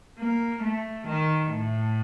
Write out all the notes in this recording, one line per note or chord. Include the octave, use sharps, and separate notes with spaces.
A#3
A3
D#3
A2